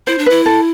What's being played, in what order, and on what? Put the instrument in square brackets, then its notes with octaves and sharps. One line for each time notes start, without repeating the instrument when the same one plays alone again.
[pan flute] E4 [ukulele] C5
[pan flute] D4
[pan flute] E4 [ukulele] B4
[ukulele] A4